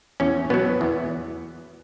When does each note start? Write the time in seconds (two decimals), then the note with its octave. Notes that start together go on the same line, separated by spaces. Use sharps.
0.20 E2 C#4
0.50 B2 F#3 B3
0.81 E2